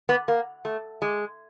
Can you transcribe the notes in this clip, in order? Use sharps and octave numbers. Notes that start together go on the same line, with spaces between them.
B3
A#3
A3
G#3